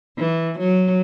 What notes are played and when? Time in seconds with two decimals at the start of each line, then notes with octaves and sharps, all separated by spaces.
0.19 E3
0.59 F#3